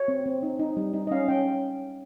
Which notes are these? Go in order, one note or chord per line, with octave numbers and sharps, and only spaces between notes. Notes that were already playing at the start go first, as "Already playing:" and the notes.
Already playing: C#5
C4
C4
D#4
D#4
G3
D#4
D#5
C#4 F5
C#4 G5